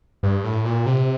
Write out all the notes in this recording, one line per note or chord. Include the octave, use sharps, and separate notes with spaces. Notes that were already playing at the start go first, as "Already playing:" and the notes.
G2
A2
A#2
C3